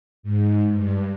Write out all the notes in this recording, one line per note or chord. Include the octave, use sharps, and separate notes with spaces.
G#2
G2